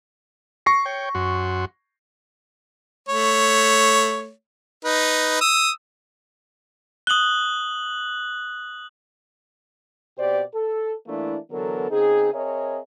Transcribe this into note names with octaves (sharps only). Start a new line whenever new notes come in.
C#6 A#6 C7
C#5 G5
F#2 F#4 C6
A3 C#5
D#4 B4
D#6 E6
D#6 F#6 F#7 G7
B2 C4 G4 C5 D5
A4
E3 A3 A#3 D4 E4
D3 E3 F#3 B3 A4 A#4
C#3 C4 D#4 G#4
C4 G#4 A#4 C#5 D#5 E5